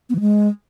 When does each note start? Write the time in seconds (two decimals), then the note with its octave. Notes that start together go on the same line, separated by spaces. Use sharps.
0.09 B3
0.15 E3
0.20 G#3